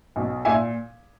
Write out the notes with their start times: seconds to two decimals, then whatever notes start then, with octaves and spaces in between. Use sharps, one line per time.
0.16 B1 B2
0.45 A#2 E5 G#5